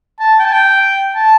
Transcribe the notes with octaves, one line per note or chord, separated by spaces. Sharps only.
A5
G5
A5
G5
A5